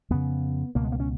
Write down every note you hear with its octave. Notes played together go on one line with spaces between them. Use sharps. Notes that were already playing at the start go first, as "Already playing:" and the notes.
F2 C#3 B3
C#2 B2 A#3
G#3
A#3
C#4